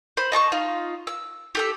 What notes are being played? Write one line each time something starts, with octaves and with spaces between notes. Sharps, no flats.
C5 B5
D#5 A5 C6 C#6
D#4 F4
E6
G4 A4 E6